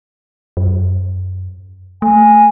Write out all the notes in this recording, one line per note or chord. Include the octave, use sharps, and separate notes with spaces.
F#2
A3 G#5